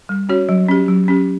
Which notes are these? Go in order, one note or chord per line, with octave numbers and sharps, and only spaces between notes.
G3
C#4 F#4 C#5
F#3
C#4 G4
F#3
C#4 G4